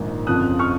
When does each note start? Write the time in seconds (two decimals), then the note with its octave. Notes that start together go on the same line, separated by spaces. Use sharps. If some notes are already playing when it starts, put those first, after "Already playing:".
Already playing: A#1 G#2 D#3
0.27 F#1 F2 F3 D#6 F#6
0.59 C#6 F6